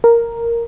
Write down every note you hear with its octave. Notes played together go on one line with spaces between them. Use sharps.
A#4